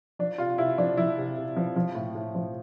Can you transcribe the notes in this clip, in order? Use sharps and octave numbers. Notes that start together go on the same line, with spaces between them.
F3 D4
C3 F4
C3 E4
F3 D4
F3 E4
C3
C3
F3
F3
A2
A2
F3